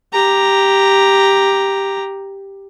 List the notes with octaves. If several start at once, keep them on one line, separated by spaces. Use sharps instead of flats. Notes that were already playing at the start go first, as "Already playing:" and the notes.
G4 A#5